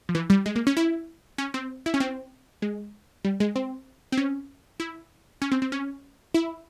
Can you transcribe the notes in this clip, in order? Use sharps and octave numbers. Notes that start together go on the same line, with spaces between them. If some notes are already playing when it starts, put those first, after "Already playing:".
F3
E3
G3
G#3
A#3
C#4
E4
C#4
C4
E4
C#4
C4
G#3
G3
G#3
C4
C4
C#4
E4
C#4
C4
C4
C#4
E4